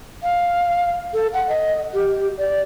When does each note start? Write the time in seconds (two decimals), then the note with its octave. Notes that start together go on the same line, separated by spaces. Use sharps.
0.23 F5
1.14 A4
1.33 F#5
1.49 D#5
1.94 G4
2.38 D5